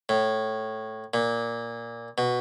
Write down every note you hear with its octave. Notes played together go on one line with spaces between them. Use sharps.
A2
A#2
B2